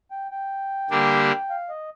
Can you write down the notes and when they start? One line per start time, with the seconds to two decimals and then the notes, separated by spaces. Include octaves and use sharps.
0.11 G5
0.31 G5
0.90 D3 G3 A#3 D4 G4
1.50 F5
1.69 D#5